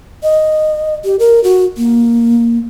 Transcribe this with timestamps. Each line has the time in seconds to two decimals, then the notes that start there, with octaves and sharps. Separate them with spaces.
0.23 D#5
1.05 G4
1.19 A#4
1.44 F#4
1.78 A#3